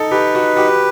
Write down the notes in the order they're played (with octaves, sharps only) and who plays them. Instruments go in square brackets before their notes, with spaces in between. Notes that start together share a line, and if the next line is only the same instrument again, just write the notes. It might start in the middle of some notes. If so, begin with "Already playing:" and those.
Already playing: [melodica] D#4 [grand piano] A4
[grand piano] G4 [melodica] B4
[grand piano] F#4
[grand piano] F#4 [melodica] G4